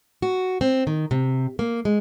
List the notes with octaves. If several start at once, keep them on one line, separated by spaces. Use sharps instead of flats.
F#4
C4
D#3
C3
A#3
G#3